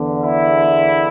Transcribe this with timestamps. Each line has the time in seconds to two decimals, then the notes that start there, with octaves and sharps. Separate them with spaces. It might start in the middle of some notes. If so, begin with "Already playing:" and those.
Already playing: E2 D3
0.21 E4